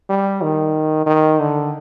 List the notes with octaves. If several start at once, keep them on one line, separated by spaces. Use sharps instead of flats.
G3
D#3
D#3
D3